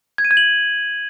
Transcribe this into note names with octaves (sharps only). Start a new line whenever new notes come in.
G#6
D#7
G#6
F#7